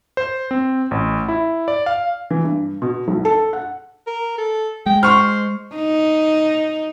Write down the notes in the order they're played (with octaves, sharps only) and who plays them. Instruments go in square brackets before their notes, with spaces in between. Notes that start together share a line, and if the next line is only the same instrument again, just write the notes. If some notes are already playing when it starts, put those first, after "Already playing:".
[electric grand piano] C5
C4
A1
E4
D5
F5
[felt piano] E3
G2
B2
B1
A4
F#5
[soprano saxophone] A#4
A4
[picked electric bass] G#3 [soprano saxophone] G5
[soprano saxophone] C5 [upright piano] C6 C#6 F6
[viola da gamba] D#4